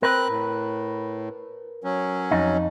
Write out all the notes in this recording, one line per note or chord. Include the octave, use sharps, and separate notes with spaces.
C4 A#4 B4 F#6
A2
F#3 C#4
F2 D#4